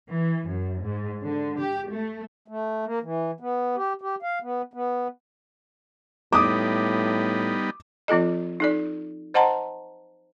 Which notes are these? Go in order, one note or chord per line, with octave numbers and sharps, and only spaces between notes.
E3
F#2
G#2
D3
G4
A3
A3
A#3
E3
B3
G4
G4
F5
B3
B3
A2 G3 B3 D#4 D6 D#6
F3 C4 F4 A4 D#5
D#4 A4 D5
C5 D#5 F#5 A5 A#5 C6